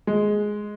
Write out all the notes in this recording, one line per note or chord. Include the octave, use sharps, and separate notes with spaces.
G#3